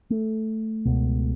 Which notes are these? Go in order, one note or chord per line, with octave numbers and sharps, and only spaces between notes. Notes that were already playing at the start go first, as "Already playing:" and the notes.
A3
C#2 B2